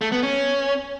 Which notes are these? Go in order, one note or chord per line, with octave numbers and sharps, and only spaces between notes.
A3
B3
C#4